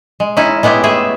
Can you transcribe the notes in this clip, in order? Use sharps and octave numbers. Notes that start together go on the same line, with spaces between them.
G#3
C#4 D#4 E4
G#3 B3 E4 G4
A3 E4 G#4 E5